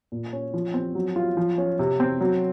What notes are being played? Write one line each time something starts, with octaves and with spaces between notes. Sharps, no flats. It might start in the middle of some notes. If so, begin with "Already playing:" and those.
A#2
C#4
F3
C4
F#3
F4
F3
C#4
C3
C4
F#3